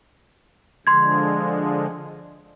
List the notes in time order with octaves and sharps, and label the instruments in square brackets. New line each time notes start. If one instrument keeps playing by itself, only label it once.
[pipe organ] D3 F3 G#3 [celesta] C6 G#6